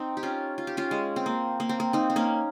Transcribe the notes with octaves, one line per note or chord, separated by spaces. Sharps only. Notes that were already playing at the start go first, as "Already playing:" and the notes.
Already playing: C4 D#4
G4
C#4 F4
F4
G4
C#4 F4
G#3
C4
A#3
A#3
C4
A#3
C4 D#4
C4
A#3 C#4